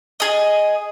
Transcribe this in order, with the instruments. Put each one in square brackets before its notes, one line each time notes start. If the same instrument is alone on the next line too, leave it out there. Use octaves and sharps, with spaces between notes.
[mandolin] G#4 D#5